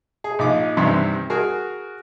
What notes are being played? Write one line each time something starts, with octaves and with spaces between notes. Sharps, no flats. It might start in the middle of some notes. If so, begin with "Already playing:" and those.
G#4
A#1 D#4 D6
G2 C3 D#3 E3
F#4 G#4 A#4